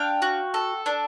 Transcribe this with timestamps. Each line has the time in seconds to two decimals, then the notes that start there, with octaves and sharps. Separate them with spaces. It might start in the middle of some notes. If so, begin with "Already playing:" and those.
Already playing: D4 F5 G5
0.22 F#4
0.54 A4
0.86 D4